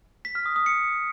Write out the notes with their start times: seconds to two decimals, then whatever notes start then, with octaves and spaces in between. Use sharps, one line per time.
0.25 B6
0.35 F6
0.46 D#6
0.56 D#6
0.66 C#7